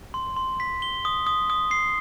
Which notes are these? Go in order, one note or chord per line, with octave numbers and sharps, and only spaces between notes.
C6
C6
B6
G7
D#6
D#6
D#6
C7